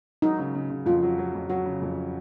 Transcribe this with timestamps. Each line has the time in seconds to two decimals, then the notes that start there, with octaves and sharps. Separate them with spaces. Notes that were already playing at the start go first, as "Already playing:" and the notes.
0.22 F#3 D#4
0.38 C#3
0.55 C#3
0.70 C#3
0.86 F2 F4
1.03 F#3
1.18 F#3
1.35 F2
1.50 F#3 F#4
1.66 C#3
1.82 F2